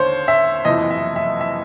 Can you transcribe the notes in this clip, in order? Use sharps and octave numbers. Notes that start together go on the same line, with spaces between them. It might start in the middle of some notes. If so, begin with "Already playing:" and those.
Already playing: D#2 D3 C5 C#5
E5
F#1 F2 C3 E3 D#5
E5
E5
E5